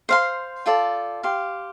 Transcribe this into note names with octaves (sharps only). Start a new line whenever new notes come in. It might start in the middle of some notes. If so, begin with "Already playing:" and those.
C5 F5 C6
F4 A4 D5 G5
G4 F5 C6